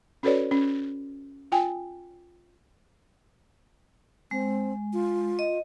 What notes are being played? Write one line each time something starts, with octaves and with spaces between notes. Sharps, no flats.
C#4 F#4 A4 B4 C#5 D5
C#4
F4 G5 G#5
G#3 C4
F4
D#5